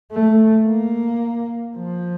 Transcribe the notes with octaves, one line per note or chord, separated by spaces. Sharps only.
A3
A#3
F3